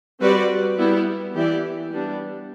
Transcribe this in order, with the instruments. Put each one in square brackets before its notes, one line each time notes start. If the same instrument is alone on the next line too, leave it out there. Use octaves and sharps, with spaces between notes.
[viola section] G3 C4 F#4 B4 D5
G3 B3 E4
E3 B3 E4 G4 D5
G3 B3 D4